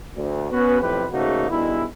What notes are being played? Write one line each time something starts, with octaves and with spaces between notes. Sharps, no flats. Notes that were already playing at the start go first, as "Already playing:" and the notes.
D2
B3 C#4 F#4 B4
B1 F2 A2 C3 G4 B4
G#2 C#3 A3 A#3 D#4 F#4
G2 B2 D#3 G#3 E4